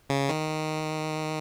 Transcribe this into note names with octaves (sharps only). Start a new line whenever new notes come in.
C#3
D#3